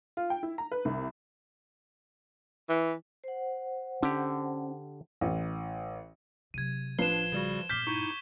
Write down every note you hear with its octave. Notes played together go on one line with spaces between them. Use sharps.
F4
G5
E4
A#5
B4
C2
E3
C5 F#5
D3 C#4 D4 G4
A1
C3 F#3 G#6 D#7
A1 F3 D4 B4 C7 E7 G7
C#3 G3 F#4
G2 A#2 D6 F6 G6 B6 C7 G7
D#4 E4 C#6